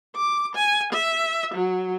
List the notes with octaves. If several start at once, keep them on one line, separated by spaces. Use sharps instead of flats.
D6
G#5
E5
F#3